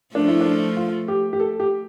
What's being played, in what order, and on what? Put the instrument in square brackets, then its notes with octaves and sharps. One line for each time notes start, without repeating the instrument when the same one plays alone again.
[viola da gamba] F3 A3 [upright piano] D4
[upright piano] E4
D4
F4
G4
G4
A4
G4